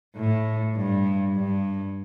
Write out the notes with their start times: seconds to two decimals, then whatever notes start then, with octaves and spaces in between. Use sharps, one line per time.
0.16 A2
0.75 G2
1.36 G2